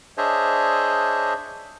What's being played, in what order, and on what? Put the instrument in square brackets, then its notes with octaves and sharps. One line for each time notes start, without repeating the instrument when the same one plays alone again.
[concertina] D4 G#4 C5 C#5 D#5 E5